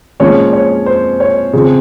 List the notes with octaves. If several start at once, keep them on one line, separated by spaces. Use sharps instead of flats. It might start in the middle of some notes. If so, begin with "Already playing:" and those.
A#2 F3 G#3 C#4 C#5
C#5
C5
C#5
C#3 F3 C4